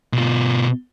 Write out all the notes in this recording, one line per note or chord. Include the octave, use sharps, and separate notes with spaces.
B2 F4